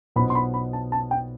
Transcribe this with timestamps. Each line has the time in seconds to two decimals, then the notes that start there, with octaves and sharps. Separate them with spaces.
0.16 B1 B2 B3 F4 C5 B5
0.30 C6
0.35 B5
0.54 B5
0.73 A5
0.92 A5
1.11 G5